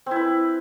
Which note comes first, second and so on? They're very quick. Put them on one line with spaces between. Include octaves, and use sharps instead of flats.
C4 E4 B4